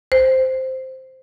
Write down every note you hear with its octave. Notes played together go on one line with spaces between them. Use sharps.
C5